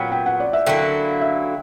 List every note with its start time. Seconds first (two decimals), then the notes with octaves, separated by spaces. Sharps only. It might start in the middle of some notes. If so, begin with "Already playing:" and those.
Already playing: A#2 F#3 B3 G5
0.12 G5
0.26 F#5
0.40 D5
0.53 E5
0.66 D3 F#3 A#3 E4 G5
1.21 E5